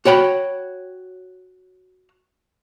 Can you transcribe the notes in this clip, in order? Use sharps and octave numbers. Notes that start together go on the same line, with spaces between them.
F#4 C#5 G5 B5